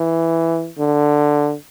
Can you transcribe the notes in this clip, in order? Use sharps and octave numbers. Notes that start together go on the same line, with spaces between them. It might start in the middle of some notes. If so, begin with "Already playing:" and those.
Already playing: E3
D3